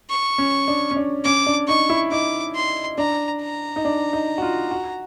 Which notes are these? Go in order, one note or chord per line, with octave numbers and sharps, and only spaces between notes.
C#6
C#4
D4
C#4
D4
C#4 D6
D4
D#4 C#6
E4
D#4 D6
C6
D4 A#5
A#5
D#4
D4
D#4
F#4
F4
F#4